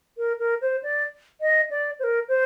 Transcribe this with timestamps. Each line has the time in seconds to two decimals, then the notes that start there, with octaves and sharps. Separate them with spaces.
0.17 A#4
0.39 A#4
0.61 C5
0.83 D5
1.41 D#5
1.70 D5
1.99 C5
2.03 A#4
2.28 C5